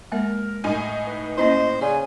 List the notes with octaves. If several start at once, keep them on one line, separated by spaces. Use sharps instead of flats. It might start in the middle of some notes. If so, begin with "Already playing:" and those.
G#3 A#3 A#4 E5
A2 D#4 G#5
B4
A#3 C#4 E4 C5 D#5
C#3 D5 G#5